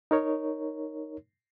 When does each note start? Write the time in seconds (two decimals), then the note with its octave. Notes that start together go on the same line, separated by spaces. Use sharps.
0.11 D#4 A#4 C#5